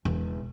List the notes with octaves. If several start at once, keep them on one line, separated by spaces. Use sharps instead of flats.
E1